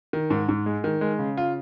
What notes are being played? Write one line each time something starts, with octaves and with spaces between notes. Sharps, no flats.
D#3
G#2
G#2
G#3
D#3
G#3
C#3
F4